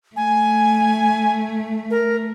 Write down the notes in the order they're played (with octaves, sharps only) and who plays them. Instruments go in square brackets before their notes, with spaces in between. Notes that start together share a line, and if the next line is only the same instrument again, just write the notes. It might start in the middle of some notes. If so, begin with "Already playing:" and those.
[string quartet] A3 [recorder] G#5
[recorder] A#4